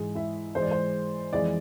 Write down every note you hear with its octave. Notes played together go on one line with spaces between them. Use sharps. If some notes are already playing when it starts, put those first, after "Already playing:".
Already playing: G#2 E3 G#3 G#4
E4 E5
G#2 E3 G#3 C5
D5
C5
F2 E3 G#3 D5